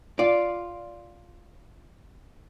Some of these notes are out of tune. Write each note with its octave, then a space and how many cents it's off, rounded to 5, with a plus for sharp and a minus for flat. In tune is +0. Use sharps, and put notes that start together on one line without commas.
F4 +0 D5 -5